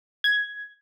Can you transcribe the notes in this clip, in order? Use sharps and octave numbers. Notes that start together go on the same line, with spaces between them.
G#6